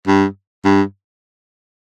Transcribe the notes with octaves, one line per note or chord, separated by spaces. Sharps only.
G2
G2